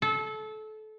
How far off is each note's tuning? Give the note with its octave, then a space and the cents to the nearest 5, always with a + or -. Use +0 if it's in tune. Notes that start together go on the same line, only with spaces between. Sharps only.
A4 -25